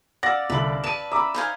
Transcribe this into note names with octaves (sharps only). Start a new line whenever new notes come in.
D5 F5 F#5 E6 A#6
C2 D3 B5 D6 F#7
B4 A5 D#7 E7
E5 A#5 B5 D6
D#4 C5 F5 G#5 B5